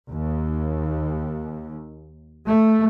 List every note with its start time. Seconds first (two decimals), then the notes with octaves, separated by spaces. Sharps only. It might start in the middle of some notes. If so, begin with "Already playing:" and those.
0.11 D#2
2.47 A3